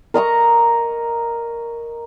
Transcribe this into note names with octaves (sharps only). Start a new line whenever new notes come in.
A#4 D#5 A#5 C#6